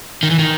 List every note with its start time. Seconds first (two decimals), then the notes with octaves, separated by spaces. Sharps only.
0.23 D#3
0.31 E3
0.39 D#3